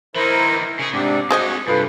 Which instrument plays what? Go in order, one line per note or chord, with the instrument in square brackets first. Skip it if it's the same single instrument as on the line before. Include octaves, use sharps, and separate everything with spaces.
[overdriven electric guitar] E3 D#4 [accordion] E4 A#4 C5
[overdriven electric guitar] C#3 G#4 [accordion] G#5
[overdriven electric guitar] G#2 [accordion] C3 C4 D4 [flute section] D6
[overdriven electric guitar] C4 G#5 [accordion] F#4 [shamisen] G#4 C5 D#5
[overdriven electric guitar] G2 [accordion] C3 F4 [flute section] A4 B4 B5